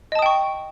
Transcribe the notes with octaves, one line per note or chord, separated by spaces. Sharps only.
D#5 G5 A5 C#6 D#6